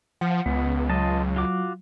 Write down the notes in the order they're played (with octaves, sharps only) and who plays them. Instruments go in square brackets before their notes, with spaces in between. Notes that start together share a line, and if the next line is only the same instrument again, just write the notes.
[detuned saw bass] F3 [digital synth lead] F#5
[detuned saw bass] C#2 [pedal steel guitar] B3
[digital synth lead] F#3 [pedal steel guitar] F4 D#5 A5
[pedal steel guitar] F4 F#4 D6